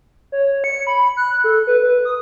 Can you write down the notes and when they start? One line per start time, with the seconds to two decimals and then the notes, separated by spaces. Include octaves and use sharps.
0.32 C#5
0.64 C#7
0.87 B5
1.17 F#6
1.44 A4
1.67 B4
1.82 B4
2.05 D#6